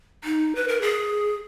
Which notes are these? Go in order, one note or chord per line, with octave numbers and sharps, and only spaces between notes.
D#4
B4
A#4
G#4